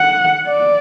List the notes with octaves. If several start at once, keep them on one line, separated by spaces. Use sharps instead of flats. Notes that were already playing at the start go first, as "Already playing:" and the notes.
Already playing: F#5
D5